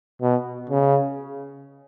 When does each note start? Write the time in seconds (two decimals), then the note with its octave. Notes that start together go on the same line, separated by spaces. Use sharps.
0.22 B2
0.70 C#3